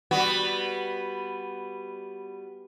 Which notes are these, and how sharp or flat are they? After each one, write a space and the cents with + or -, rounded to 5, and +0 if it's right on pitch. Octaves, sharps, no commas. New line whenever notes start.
G3 +0 B3 +0 F#4 +0